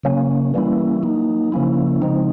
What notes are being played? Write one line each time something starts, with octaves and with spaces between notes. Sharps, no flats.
C#3 F#3 A#3 C#4
E3 G3 A#3 C#4 E4
F#3 A#3 D#4
C#3 F3 A#3 C#4 E4
C#3 F3 G#3 C4 D#4